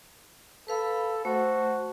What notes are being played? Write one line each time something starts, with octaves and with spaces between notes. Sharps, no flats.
A4 B4 F5 B5
A3 F#4 C5